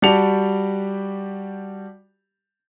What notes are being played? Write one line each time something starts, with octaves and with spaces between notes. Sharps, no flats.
G3 F#4 G4 A5 C#7 F7